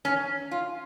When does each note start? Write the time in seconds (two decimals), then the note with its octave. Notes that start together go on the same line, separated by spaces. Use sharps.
0.05 C#4
0.51 F4